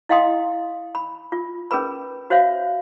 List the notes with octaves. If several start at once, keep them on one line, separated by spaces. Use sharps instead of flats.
E4 D#5 F5 G5 C6 D#6
B5
F4
C#4 G#4 A#4 B4 B5
F#4 C5 C#5 E5 F5